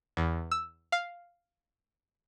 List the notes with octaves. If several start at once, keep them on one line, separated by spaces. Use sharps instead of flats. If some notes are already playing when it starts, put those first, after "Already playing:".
E2
E6
F5